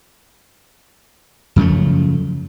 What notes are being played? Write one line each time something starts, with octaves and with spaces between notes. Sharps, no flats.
F#2 C#3 F3 A3